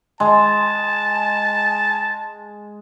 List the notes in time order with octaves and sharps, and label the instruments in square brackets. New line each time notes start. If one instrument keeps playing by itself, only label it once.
[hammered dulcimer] G#3 [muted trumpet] A5